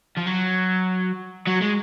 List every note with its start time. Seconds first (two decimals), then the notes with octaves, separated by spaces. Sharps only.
0.17 F3
0.27 F#3
1.47 F#3
1.62 G#3